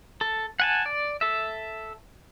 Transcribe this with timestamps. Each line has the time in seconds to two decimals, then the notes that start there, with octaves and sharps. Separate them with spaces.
0.21 A4
0.60 F#5 G#5 A5
0.86 D5
1.21 A4 E5